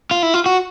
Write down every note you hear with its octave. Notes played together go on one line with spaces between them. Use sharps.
F4
E4
F4
F#4